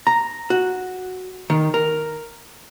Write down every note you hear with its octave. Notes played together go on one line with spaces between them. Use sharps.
A#5
F#4
D#3
A#4